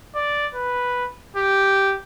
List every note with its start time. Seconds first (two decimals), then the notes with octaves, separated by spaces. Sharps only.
0.15 D5
0.55 B4
1.37 G4